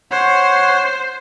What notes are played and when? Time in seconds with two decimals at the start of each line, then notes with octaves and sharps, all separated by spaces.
0.11 C5 C#5 F#5